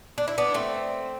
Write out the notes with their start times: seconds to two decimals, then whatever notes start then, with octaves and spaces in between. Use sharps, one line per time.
0.18 D4
0.28 E4
0.38 B3 D4
0.54 A3 C4